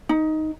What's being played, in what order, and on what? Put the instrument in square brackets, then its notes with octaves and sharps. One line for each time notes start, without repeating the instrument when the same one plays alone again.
[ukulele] D#4